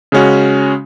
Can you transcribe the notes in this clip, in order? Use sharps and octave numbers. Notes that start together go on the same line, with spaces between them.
C#3 G#3 C#4 F#4